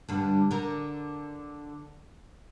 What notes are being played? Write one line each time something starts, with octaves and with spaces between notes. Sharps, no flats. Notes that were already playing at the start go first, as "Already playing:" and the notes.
G2 D3
D3 A#4